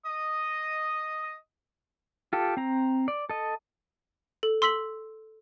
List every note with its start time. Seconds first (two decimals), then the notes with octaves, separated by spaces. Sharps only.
0.06 D#5 D#6
2.33 F4 G4 A4
2.57 C4 A#5
3.08 D5
3.29 A4 D#5
4.43 A4
4.62 C6 E6 B6 F#7